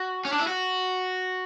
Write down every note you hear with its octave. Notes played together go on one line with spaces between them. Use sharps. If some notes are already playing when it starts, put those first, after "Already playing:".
Already playing: F#4
C#4
D4
E4
F#4